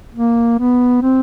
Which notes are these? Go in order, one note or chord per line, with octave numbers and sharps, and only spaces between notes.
A#3
B3
C4